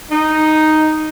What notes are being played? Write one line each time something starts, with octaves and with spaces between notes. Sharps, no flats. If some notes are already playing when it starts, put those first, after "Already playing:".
D#4